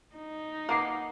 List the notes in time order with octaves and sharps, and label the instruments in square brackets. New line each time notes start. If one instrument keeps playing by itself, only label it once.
[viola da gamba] D#4
[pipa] A#3 [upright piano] F#5 D6 C7